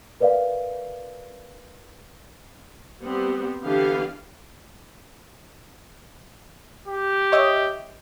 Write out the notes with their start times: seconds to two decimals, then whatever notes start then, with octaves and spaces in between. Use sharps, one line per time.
0.20 A#4 B4 D5 E5 F5
3.03 G3 B3 C4 G4
3.64 D3 E3 B3 G4 F5
6.88 G4
7.32 C#5 D#5 E5